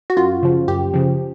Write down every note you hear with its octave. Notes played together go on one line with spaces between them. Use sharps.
F#4
F#2 F4
C#3 F3
F#2 G4
C#3 F3